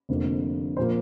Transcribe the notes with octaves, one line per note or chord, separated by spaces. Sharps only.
F1 F2 D3 A#3
A#2 F3 A#3 C5